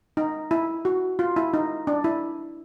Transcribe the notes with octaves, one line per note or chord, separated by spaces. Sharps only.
D#4
E4
F#4
F4
E4
D#4
D4
E4